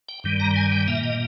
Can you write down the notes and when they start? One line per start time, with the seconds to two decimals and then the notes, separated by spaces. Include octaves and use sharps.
0.09 G5
0.24 G2 D#3 G3
0.40 A#5
0.56 G#5
0.72 G5
0.88 A#2 A#3 E5
1.03 D#5